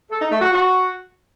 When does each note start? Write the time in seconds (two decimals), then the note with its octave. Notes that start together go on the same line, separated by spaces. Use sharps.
0.10 A4
0.21 D#4
0.31 A3
0.41 F#4
0.52 F#4